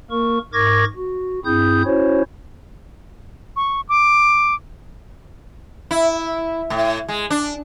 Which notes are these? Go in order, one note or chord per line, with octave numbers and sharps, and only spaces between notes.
A#3 A#4 C#6
G#2 A#4 C#6 D6 G#6 A#6
F#4
G2 C4 E4 G#4 D#6 G6
C#4 E4 F#4 C5 C#5
C#6
D6
E4
A2
G#3
D4